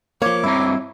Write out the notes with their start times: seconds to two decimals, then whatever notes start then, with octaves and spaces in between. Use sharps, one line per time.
0.22 F3 A#3 C#5 D6
0.44 G2 C4 E4 A#5